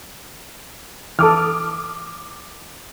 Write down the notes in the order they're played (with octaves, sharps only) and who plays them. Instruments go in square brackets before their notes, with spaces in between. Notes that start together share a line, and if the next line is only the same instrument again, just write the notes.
[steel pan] E3 A4 [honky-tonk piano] D6 D#6 F6